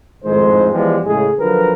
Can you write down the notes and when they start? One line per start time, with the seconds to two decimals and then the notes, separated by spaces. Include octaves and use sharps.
0.23 G#1 F2 A2 D#3 G#3 C5
0.72 E3 F3 G3 G#3 B3 G4
1.04 A2 C#3 G#3 G#4
1.39 D3 F3 F#3 A#4 B4